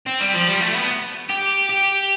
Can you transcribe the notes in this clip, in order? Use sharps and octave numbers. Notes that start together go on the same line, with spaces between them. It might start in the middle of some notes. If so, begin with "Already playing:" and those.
C4
G3
F3
G3
A3
B3
G4
G4